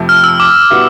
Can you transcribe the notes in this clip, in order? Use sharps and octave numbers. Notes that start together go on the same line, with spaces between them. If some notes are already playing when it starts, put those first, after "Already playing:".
Already playing: F2 C3 F3 A3
F6
E6
D6
B2 G3 B3 E4